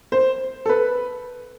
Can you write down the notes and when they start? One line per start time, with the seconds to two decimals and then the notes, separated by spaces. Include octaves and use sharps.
0.12 C5
0.66 A4
0.69 B4